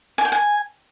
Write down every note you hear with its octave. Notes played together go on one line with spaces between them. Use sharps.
G#5
G5
G#5